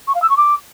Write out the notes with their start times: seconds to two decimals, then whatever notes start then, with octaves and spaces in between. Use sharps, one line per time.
0.07 C#6
0.14 F5
0.22 E6
0.29 C#6
0.37 D6